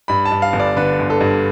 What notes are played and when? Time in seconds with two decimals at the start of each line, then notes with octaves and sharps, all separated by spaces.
0.08 G2 B5
0.25 A5
0.32 G2
0.42 F5
0.53 G1
0.60 D5
0.76 D3 B4
0.99 G1
1.10 A4
1.21 G2